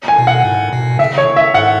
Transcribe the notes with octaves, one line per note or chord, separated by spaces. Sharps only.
G#5
B2
F#5
G#2
B2
C#3 E5
C#5
E5
G#2 F#5